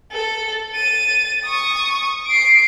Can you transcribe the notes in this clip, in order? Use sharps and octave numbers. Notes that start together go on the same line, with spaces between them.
A4
A6 D#7
C#6 D#6
C7 D7